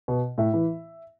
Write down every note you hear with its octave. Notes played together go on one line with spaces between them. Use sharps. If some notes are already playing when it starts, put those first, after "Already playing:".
B2
A2 E5
E3